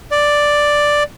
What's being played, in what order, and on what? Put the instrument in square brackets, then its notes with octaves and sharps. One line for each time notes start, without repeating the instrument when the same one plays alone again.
[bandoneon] D5